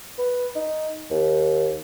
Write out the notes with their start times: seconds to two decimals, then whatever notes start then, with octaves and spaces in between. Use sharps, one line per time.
0.18 B4
0.55 D#4
1.11 D#2